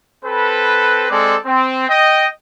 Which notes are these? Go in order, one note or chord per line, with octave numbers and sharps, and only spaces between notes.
C4 A4 B4
G#3 C4 A4 D5
C4
D#5 G5